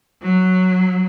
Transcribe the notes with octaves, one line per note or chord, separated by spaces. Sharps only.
F#3